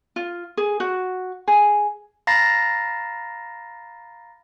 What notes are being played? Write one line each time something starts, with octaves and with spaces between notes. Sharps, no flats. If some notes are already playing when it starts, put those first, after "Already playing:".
F4
G#4
F#4
G#4
F5 A#5 B5 A6 A#6 C7